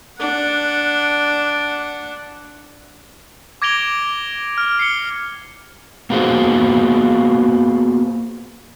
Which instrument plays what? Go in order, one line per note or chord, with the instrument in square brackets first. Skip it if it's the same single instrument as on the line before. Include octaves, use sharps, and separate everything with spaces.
[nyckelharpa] D4 F#5
[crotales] D6 G#6 A#6 D7 F7 G7
F6
C7 C#7 G7
[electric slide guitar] A#3 B3 F4 F#4 G#4 C5